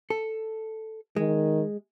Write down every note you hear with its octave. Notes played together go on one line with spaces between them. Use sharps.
A4
D#3 G#3